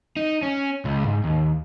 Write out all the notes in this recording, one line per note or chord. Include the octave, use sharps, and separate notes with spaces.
D#4
C#4
C#2
G#2
D#2